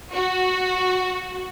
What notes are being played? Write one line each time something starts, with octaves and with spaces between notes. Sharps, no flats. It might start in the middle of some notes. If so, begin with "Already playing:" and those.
F#4